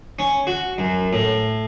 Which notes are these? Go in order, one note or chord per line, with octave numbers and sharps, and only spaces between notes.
C#4
F#4
F#2
A2